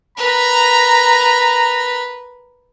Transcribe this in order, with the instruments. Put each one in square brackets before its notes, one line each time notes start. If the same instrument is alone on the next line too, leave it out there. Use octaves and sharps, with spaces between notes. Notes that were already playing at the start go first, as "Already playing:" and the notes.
[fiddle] A#4 B4 [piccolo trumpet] A#5